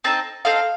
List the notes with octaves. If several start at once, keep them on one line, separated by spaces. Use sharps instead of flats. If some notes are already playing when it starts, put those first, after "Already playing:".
C4 D#4 A4 A5
C4 D#4 A4 F5